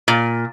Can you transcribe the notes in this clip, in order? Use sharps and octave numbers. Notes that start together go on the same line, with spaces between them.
A#2